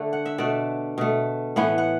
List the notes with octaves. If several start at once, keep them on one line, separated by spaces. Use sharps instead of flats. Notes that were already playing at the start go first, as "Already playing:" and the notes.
Already playing: D3 A3
F#5
E5
B2 A3 D5
B2 A3
A2 E3 B3 F#5
F#5